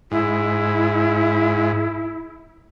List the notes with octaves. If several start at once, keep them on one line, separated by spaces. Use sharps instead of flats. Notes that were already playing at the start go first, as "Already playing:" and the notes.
G#2 E4